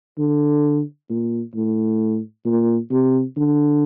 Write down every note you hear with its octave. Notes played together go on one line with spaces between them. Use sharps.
D3
A#2
A2
A#2
C3
D3